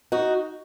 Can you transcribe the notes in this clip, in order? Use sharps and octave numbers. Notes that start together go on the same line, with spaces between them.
D#4 F#4